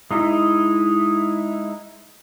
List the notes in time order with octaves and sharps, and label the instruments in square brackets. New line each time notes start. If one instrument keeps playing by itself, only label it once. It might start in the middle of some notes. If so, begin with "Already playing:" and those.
[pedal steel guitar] G#3 D#4 E4